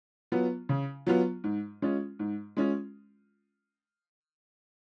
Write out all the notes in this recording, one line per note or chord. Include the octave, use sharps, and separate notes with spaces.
F#3 B3 F4
C#3
F#3 B3 F4
G#2
G#3 C#4 F4
G#2
G#3 C#4 F4